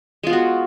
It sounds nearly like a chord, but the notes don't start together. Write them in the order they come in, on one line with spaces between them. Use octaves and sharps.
G#3 F4 B3 F#4